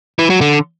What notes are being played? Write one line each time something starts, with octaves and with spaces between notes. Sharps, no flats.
E3
F#3
D3